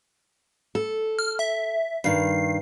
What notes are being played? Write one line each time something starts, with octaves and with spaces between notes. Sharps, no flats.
A4
F6
E5
G2 D#3 C7